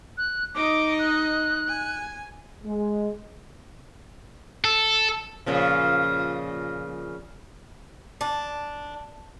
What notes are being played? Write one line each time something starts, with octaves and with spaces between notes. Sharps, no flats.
F#6
D#4 D#5 D6
F#6
G#5
G#3
A4
A#2 C#3 F3
D4